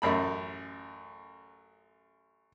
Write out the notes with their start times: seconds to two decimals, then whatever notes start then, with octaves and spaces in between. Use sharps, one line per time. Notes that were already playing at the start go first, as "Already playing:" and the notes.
0.02 A1 F#2 B5